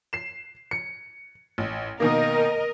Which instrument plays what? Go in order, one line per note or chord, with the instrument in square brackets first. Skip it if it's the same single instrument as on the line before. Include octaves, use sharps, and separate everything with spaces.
[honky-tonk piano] C7 E7
C#7
A1
[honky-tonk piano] B2 D#3 A#3 [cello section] A#4 D#5